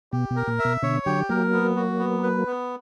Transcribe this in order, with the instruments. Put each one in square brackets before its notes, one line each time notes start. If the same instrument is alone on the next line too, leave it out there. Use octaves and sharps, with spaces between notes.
[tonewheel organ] B2 [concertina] G4
[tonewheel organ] B2
[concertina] A#4
[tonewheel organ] A#2
[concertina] E5
[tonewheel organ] B2
[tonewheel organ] B2 D3 [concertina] C#5
[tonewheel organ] D3 F#3 [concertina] G4
[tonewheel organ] F#3 A#3 [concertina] A#4
[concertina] B3
F#4
B3
B4
B3